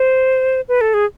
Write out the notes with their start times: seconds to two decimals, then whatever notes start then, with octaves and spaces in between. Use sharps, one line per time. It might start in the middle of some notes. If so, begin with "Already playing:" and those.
Already playing: C5
0.68 B4
0.81 A4
0.94 G#4